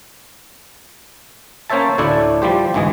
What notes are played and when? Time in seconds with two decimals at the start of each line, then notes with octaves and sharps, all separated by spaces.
1.70 A#3 C#4 C5 C#5 E5 A5
1.98 D2 A2 A3 D4 E4 D5
2.42 F3 G3 G4 C5
2.74 G#1 D2 E3 G#3 G#4